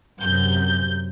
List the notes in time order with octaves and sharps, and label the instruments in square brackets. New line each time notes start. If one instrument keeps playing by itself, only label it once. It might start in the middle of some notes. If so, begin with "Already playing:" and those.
[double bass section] F#2 C3 [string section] G6